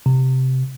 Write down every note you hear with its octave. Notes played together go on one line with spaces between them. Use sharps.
C3